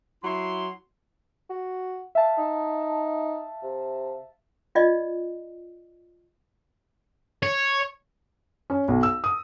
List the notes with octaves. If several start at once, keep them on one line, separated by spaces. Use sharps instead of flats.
F#3 E4 C6
F#4
E5 F5 A5
D#4
C3
F4 D5 D#5
C#5
C#4
B1
E6
D#6